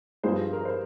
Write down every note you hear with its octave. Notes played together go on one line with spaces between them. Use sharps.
G2 F3 G#3 G#4 C5
A#4
C5